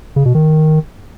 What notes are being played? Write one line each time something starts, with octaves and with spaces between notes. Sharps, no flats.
C#3
B2
D#3